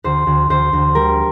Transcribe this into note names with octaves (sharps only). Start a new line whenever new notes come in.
D2 C5
D2
D2 C5
D2
G3 A#4